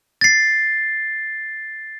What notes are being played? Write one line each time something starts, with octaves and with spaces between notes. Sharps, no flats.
A6 C7